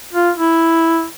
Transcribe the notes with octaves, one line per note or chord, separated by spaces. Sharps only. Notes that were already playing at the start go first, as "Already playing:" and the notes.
F4
E4